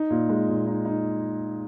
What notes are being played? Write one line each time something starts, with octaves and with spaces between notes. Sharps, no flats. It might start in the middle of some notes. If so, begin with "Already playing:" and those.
Already playing: D#4
A#2
G#3
A#2
D#4
D#4